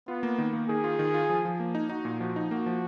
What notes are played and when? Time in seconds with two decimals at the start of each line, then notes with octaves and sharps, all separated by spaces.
0.08 B3 F4
0.23 A#3
0.38 D#3
0.53 A#3
0.69 D#3 G#4
0.84 F4
0.99 D#3
1.14 F4
1.29 F3
1.45 F3
1.60 A#3
1.75 D#4
1.89 D#4 F#4
2.05 A#2
2.20 F3 F#4
2.36 D#4
2.51 A#3 F#4
2.66 F3